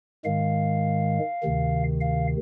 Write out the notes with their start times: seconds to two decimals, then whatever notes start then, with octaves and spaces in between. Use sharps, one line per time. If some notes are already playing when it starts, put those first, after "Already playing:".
0.24 G#2 D#3 G#3 F5
1.43 D2 C3 D#3
2.01 F5